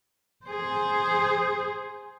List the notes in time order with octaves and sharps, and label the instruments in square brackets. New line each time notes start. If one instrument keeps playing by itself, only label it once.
[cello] G#4 C5